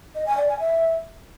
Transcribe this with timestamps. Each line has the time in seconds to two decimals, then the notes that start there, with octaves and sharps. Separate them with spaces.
0.15 D#5
0.26 G#5
0.37 D5
0.48 G#5
0.60 E5